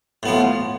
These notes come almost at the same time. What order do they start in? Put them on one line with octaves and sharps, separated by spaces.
A2 B3 F3